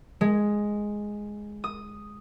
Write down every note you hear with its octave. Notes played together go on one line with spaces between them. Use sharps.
G#3
D#6